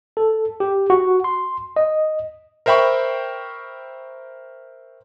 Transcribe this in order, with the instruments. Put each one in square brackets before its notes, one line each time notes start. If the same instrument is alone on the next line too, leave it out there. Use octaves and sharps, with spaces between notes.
[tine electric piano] A4
G4
F#4
C6
D#5
[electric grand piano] A#4 C5 E5 G5 B5 C#6